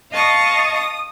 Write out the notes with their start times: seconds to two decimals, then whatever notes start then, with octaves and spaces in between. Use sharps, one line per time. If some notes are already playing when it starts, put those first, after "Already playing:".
0.11 D#5 F5 A5 C#6 D#6
0.73 D#6